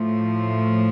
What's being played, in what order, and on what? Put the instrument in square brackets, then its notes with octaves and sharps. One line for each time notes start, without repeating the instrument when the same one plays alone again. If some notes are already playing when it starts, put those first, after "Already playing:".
Already playing: [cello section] A2 F3 A3